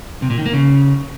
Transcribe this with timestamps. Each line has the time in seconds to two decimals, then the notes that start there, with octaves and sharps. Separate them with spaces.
0.22 C3
0.30 A#2
0.38 D#3
0.46 A#3
0.53 C#3